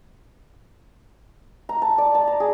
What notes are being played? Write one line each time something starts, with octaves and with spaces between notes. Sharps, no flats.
A#5
A5
D5
A5
A#5
G#4